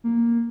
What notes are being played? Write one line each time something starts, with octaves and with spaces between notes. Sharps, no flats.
A#3